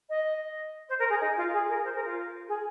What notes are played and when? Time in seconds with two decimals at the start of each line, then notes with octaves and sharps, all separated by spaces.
0.09 D#5
0.89 C5
0.99 A#4
1.09 G#4
1.20 D#4
1.36 F4
1.53 G#4
1.68 A#4
1.84 C5
1.95 A#4
2.05 F4
2.48 G#4